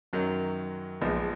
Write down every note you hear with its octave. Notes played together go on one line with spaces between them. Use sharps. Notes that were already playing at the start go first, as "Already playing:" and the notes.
F#2 D#3 F#3
A#1 G#2 F3 G#3 B3